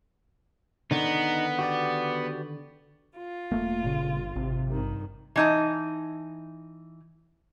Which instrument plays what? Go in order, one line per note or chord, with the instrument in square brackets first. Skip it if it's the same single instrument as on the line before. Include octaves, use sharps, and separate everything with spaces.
[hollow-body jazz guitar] D3 D#3 [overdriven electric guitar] B3 [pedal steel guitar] D#4
[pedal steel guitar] F#4 G4 D5
[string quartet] F4
[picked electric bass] E1 A3 A#3
[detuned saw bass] G1 [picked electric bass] A#2 C#3
[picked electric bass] G#1 [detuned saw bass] C3
[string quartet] G2 D#3
[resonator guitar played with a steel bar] E3 D#4 A5